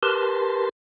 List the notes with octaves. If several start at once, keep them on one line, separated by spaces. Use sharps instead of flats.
G4 A#4 B4 A5 C6